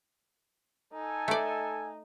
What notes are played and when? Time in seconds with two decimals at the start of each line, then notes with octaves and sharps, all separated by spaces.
0.93 D#4 A4 G#5
1.28 A3 D5